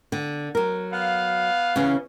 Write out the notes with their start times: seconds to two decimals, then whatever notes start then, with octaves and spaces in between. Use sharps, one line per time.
0.12 D3
0.55 F#3 A#4
0.93 B3 F5
1.76 C#3 E3 C#4